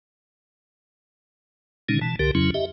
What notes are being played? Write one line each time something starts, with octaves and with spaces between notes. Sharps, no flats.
A#2 D3 D#3 G#3 C#4 D#4
B2 E3 A5
C2 D3 G4 A#4
F2 C#3 F#3 C#4 E4
G4 D#5 E5